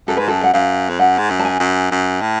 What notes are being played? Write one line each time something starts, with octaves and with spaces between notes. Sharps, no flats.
F#2 A4
G#2 B4
F#2 A4
F#5
F#2 F5
F2
F#2 F#5
G#2
F#2
A5
G#5
F#2
F#2
A2